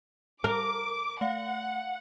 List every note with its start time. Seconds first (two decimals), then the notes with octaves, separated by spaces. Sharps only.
0.44 A#4 D6
1.21 A3 F5 F#5